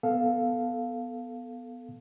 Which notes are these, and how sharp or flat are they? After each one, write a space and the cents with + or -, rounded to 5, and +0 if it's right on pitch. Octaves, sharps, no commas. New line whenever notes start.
B3 +0 A4 +0 F5 +0